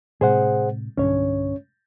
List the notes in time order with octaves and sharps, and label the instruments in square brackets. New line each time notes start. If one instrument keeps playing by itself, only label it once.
[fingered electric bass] A2 C3 G#3 [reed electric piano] G#4 C5 F#5
[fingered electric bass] B1 G2 D3 [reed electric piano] C#4 C#5